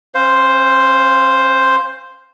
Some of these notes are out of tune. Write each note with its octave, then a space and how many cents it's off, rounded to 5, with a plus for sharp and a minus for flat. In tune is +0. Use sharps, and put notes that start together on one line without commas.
C#4 -45 C5 +0 F5 +0